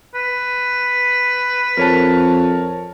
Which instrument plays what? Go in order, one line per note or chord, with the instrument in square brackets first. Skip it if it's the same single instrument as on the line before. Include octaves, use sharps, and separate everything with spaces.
[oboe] B4
[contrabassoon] F2 [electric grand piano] A#4 C#5 A5